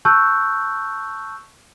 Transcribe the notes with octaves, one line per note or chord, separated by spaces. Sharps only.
A5 C#6 E6 F#6 G6